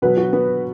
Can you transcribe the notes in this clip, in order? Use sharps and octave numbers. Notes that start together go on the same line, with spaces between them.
B2 F#3 B4
F#4
B3